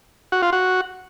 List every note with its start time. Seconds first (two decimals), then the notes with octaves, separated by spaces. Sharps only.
0.32 F#4
0.42 F4
0.53 F#4